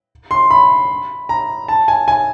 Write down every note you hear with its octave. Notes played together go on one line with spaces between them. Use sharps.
C6
B5
A#5
A5
G#5
G#5